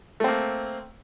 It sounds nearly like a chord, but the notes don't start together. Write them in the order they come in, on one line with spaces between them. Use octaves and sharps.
A3 C4 A#3